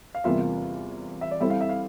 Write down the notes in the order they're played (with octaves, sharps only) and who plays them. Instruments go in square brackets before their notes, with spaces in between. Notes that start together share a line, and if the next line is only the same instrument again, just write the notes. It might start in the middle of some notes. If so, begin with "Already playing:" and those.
[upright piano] F5
[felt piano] E2 C3 G3 A#3 F4 [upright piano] E5
[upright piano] F5
E5
D5
[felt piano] G3 C4 E4 A4 C5 [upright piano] E5
[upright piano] F5
E5
F5